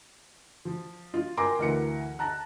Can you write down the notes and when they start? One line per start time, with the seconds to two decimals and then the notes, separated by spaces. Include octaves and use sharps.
0.65 F3
1.14 F4
1.37 A#4 G5 G#5 A#5 C6 D6
1.59 D2 E3 A#4 F#5 C#7
2.19 A5 A#5 F#6